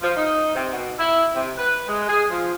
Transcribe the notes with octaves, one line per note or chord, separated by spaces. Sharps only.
F3
D#4
C3
B2
E4
C3
B4
G#3
G#4
F3